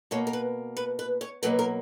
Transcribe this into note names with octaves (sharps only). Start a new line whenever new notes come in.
B2 A#3 C#5
A#4
B4
B4
B4
C#5
B2 F#3 A#3 B4
A#4